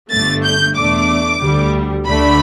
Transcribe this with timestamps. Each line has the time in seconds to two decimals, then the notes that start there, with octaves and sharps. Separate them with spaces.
0.11 G1 G2 D3 A3 A6
0.45 G6
0.76 E2 B2 A3 D4 D6
1.41 D2 D3 G3
2.07 D2 D3 A3 D4 B5